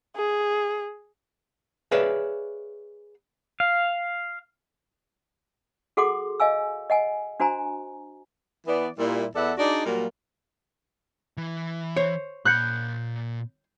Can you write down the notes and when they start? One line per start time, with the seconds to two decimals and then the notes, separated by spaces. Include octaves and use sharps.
0.16 G#4
1.91 G#4 B4 C#5 D5 E5 F5
3.60 F5
5.97 F#4 G#4 A4 F#5 C6 D6
6.40 D#5 F5 G#5 E6
6.90 D#5 F#5 G#5
7.40 D4 F#4 C5 G#5 A#5
8.67 E3 B3 D5
8.99 A#2 G3 E4
9.36 E2 B3 A4 D5 E5 F#5
9.58 D4 D#4 F#4 G#4 D5
9.86 A#2 F#3 G3 A#3
11.37 E3
11.97 C5 C#5
12.45 A#2 B5 F#6 G6 C#7